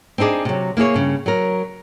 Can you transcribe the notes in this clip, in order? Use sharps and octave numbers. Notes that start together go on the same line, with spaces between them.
C4 D4 D#4 G#4 D5
C3 F#3
A#3 E4 G#4 C#5
G2 C#3
F#3 A#4